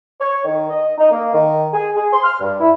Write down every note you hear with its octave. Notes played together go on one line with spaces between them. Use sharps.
C#5
D#3
D#5
D#4
A#3
D#3
G#4
G#4
C6
F6
G2
E4